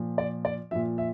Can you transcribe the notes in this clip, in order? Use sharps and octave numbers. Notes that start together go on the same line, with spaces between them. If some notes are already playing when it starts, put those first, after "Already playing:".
Already playing: A#2 F3
D5
D5
A#2 F3 E5
E5